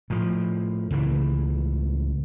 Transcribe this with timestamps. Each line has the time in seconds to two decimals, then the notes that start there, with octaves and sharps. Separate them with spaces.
0.10 A2 F3
0.91 C#2 A2 E3